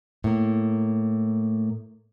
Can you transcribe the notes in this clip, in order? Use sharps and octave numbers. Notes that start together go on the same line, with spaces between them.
A2 A#3